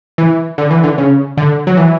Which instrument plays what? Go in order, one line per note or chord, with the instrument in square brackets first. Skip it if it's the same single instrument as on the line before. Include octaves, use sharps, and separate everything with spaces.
[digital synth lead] E3
D3
E3
D3
C#3
D3
F#3
E3